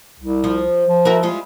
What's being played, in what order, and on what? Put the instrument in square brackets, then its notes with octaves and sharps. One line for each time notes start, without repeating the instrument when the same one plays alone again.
[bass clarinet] C2
[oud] F3
[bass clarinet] F3
[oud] E4 F#4 A#4
G3 G#3 F4